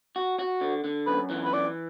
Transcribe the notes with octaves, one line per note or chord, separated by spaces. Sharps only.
F#4
F#4
D3
D3
F#2 B4
E3
B4
E3 D5